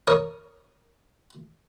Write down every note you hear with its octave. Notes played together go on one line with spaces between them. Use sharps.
A#4 C#5 D#6